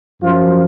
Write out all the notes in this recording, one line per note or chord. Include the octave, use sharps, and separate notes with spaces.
F#2 F3 F4